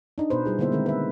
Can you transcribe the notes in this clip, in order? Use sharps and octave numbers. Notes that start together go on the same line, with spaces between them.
D4 D#4
B2 B3 B4 C5
G3 F4 G#4
D3 A#3 B3 E4 C5 E5
D#3 G#3 C4 A#4
B4 E5